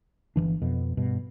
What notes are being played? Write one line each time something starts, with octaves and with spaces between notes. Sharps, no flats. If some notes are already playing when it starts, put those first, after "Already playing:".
G1 F2 E3 D4
F2 B2
G2 B2